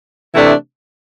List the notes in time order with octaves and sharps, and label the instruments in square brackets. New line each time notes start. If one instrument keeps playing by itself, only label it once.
[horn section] C3 E3 A3 D4